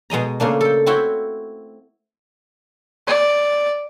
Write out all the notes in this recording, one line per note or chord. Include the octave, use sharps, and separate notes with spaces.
B2 G#3 D#5 A#5
C#3 A3 A#3 D4
A4 G5
C4 E4 F#4 C#5 G5
D5